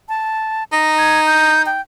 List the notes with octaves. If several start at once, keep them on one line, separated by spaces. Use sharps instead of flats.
A5
D#4 A#6
G#6
G6
G5